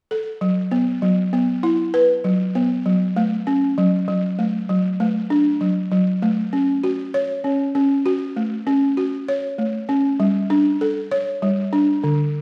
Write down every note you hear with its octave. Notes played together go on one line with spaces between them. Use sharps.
A4
F#3
B3
F#3
B3
E4
B4
F#3
B3
F#3
A3
C#4
F#3
F#3
A3
F#3
A3
D4
F#3
F#3
A3
C#4
F#4
C#5
C#4
C#4
F#4
A3
C#4
F#4
C#5
A3
C#4
G3
D4
A4
C#5
G3
D4
D3